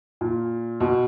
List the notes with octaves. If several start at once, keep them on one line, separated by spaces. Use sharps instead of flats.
A#2
B2